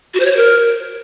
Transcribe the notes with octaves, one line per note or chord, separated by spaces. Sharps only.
F#4
C5
C#5
C5
A#4